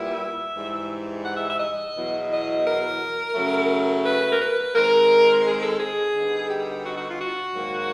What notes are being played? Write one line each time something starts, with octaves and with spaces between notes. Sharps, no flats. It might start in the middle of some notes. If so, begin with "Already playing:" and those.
Already playing: A#2 G3 B3 E4 E5
G#2 E3 G3
F#5
E5
E5
D#5
E2 B2 F#3 B3 E4
D#5
A#4
F#2 C#3 F#3 A3
B4
A#4
B4
D#3 G#3 C4 A#4
G#4
A4
G#4
D3 G3 B3 D#4
G4
F#4
F#4
F4
F#4
G#2 D#3 F#3 A#3